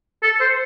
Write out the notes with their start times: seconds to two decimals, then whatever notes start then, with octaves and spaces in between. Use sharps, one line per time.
0.23 A4
0.40 C5